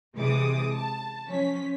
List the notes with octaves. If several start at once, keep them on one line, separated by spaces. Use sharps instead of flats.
C3 E3 G#3 D6 D#6
A5
F3 C#4 B6